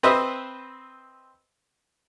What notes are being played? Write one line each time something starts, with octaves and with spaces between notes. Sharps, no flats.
C4 B4 C5 D#5 E5